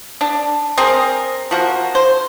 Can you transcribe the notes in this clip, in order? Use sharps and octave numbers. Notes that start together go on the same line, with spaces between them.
D4
C4 G#4 A#4
F3 F#4 A#4
C5